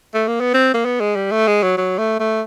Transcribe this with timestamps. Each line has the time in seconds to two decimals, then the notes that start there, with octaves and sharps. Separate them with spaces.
0.14 A3
0.27 A#3
0.40 B3
0.54 C4
0.74 A#3
0.85 B3
1.00 G#3
1.16 G3
1.31 A3
1.47 G#3
1.63 F#3
1.78 F#3
1.98 A3
2.20 A3